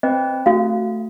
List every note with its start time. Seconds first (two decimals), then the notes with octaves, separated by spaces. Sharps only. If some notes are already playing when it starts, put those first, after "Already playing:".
0.03 C4 B4 D#5
0.46 A3 F#4 F5